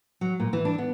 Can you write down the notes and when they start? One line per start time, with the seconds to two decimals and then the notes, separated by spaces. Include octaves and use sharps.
0.21 F#3
0.40 A#2
0.53 E3
0.65 D4
0.78 B3